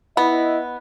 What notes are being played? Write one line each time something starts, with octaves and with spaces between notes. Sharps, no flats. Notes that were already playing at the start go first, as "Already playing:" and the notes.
B3 E4 D#5